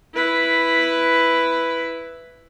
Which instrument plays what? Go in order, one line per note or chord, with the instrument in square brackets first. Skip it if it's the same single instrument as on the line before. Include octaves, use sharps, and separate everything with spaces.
[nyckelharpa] E4 B4